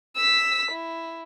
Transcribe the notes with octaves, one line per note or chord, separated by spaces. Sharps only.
E6 B6
E4